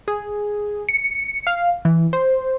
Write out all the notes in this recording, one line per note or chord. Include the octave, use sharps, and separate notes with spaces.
G#4
C#7
F5
E3
C5